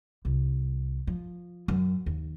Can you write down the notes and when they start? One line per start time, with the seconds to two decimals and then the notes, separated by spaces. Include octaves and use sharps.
0.25 C2
1.07 F3
1.68 F#2
2.06 D#2